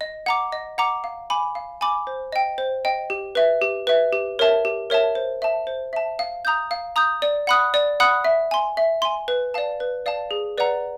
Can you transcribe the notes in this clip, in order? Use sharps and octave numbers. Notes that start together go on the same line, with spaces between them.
D#5
F#5 A#5 D6
D#5
F#5 A#5 D6
F5
G#5 B5 D6
F5
G#5 B5 D6
C5
D#5 G5
C5
D#5 G5
G4
B4 E5
G4
B4 E5
G4
A#4 C#5 E5 A5
G4
A#4 C#5 E5 A5
C5
E5 A5
C5
E5 A5
F5
A#5 D#6 G6
F5
A#5 D#6 G6
D5
F#5 B5 D#6 F#6
D5
F#5 B5 D#6 F#6
E5
G#5 C6
E5
G#5 C6
B4
D5 F5 A5
B4
D5 F5 A5
G#4
B4 D5 F#5 A#5